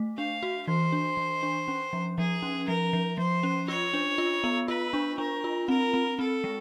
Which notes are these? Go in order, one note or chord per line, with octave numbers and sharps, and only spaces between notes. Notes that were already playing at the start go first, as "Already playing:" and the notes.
Already playing: A3
D4 F5
F#4
E3 C5
D4
E3
D4
C#4
F3
F3 G#4
C#4
F3 A#4
F3
F3 C5
C#4
F4 C#5
D4
F4
B3
F4 B4
D4
D4 A#4
F4
C4 A#4
C4
C4 A4
G#3